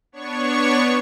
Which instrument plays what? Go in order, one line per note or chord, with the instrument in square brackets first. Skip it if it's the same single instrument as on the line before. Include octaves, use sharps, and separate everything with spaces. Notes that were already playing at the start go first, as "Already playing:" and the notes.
[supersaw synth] B3 D4 C#5 C#6